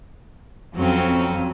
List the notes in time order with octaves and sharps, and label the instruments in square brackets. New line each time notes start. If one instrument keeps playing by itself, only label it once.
[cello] F2 [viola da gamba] F#3 C4 C#4